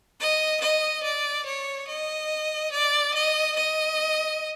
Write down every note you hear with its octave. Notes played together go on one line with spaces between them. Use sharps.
D#5
D#5
D5
C#5
D#5
D5
D#5
D#5